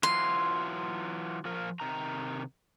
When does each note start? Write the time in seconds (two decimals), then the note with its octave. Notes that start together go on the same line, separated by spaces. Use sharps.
0.03 E3 F#3 F4 C6
1.45 F3 F4 A#4
1.80 C3 D#3 A#5